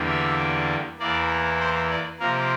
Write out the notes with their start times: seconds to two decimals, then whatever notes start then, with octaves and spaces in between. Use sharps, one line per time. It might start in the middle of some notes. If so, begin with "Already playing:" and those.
Already playing: E2 D3 G3 A#3
0.09 E5
0.99 E2 E3 A#3 D5
1.60 C5
1.90 D5
2.20 C3 F3 A#3 A#4